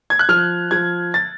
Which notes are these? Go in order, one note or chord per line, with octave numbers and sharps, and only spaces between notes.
G#6
F#6
F3 F6
F3 G#6
A6